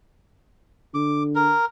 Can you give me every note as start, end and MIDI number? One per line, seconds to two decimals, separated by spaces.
0.94 1.53 50
0.94 1.23 86
1.35 1.65 70